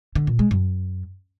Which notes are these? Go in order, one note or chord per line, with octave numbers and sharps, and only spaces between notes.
D3
A#2
G#3
F#2